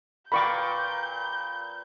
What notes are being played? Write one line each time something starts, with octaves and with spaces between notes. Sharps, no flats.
A#2 B4 F5 G5 B5 C#6 D6 G6